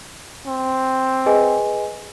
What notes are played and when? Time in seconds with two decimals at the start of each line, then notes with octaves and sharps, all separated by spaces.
0.46 C4
1.26 G#4 B4 D#5 G#5